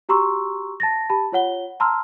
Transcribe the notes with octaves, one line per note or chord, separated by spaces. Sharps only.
F#4 G4 A#5 C6 C#6 E6
A5 A6 A#6
G4 A5 B5
F4 C#5 F#5 G7
A5 A#5 C6 E6 F6